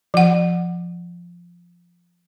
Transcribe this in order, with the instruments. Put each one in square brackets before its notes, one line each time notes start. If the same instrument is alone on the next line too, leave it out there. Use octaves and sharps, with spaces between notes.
[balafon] F3 F#5